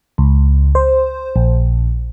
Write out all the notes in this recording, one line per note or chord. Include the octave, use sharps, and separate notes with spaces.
C#2
C5
A#1